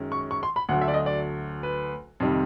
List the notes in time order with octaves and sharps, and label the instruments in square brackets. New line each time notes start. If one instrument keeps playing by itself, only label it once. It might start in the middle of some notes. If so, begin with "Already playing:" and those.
Already playing: [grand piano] F#2 D#3 G#3 C#4
C#6
C#6
C6
B5
D2 D3 F#3 A3 F#5
E5
D5
D#5
D5
B4
F2 C3 D#3 G3